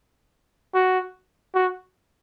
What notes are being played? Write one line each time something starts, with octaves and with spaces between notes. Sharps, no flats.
F#4
F#4